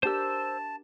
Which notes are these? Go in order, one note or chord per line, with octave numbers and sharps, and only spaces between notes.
D4 G4 A#4 C5 A5 E6